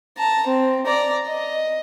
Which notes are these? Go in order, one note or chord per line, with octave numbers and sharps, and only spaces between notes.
A5 A#5
C4
D5 A#5
D#5